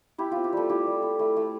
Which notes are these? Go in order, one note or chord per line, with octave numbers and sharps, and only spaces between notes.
E4 G4
C4 F4
G4
G3 A3 A4
E4 G4
G3
E4
A3
A3